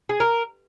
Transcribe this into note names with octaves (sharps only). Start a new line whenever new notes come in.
G#4
A#4